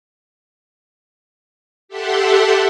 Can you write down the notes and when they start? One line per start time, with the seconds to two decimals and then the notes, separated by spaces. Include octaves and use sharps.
1.88 G4 A4 E5 F#5 C6